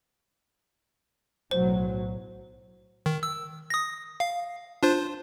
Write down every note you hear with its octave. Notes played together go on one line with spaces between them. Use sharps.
B1 A2 F#3 C5
D#3
E6
D#6 A#6
F5
D4 F4 C5